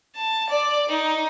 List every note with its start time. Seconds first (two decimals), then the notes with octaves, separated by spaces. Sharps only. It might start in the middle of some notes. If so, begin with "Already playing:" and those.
0.16 A5
0.49 D5
0.89 D#4